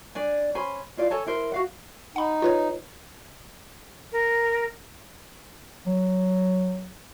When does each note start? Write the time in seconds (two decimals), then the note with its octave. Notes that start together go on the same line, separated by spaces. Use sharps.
0.15 D4 D5 G#5
0.55 C#4 C5 G#5 B5
0.97 E4 F4 D5 F5
1.11 A4 C#5 G#5 A5
1.26 E4 A#4 C5
1.52 F#4 F5 F#5
2.16 D#4 F#5 B5
2.42 F4 B4 C#5
4.12 A#4
5.86 F#3